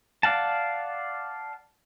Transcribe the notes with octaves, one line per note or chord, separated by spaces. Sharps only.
D5 F5 F#5 A5